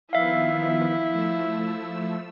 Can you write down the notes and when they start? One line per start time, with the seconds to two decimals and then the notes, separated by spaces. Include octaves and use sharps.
0.13 D#3 F3 B3 E4 E5 F5
1.10 F3 A3 E6